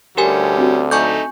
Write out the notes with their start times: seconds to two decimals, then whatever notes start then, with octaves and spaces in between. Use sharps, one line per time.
0.17 D2 G3 C#4 G4 A#4 G#5
0.57 C4 D4 F#4
0.91 A3 D#4 G#5 C#6 D6 G6